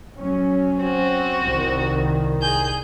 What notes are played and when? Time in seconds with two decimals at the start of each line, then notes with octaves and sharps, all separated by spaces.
0.17 F#3 C#4
0.81 C4 F#4
1.43 C2 D#3
2.41 G#4 G6